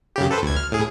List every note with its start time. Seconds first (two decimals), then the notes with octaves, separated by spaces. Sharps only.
0.16 F#2 C#3 G4
0.31 A4 B4 C5
0.42 D2 G#6
0.56 F6
0.72 A2 G#4